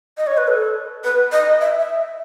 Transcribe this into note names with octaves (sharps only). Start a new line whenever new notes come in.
D#5
C#5
B4
A4
B4
D#5
E5
E5